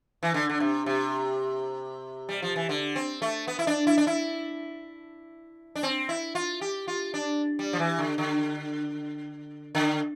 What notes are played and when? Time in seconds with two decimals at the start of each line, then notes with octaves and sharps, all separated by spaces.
0.23 E3
0.34 D3
0.50 D3
0.60 C3
0.86 C3
2.29 G3
2.42 F3
2.56 E3
2.69 D3
2.96 C4
3.22 A3
3.48 B3
3.59 E4
3.67 D4
3.87 E4
3.97 D4
4.07 E4
5.76 D4
5.83 C4
6.09 E4
6.35 F4
6.61 G4
6.88 F4
7.14 D4
7.59 G3
7.73 F3
7.79 E3
7.99 D3
8.18 D3
9.75 D3